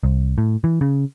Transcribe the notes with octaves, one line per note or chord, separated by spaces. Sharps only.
C2
A2
E3
C#3